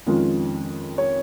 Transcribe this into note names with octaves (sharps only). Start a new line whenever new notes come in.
F2 D#3 G#3 C#4 F4
C#5